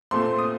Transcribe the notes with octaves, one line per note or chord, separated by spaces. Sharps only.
A#2 A3 C4 C6
D#6